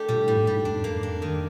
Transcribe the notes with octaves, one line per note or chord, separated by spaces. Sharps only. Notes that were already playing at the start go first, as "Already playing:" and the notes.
Already playing: A3 D4 G4
A#2 G3
A2 G3
G#2
G#2 G3
F2 D4
A#3
D4
D#3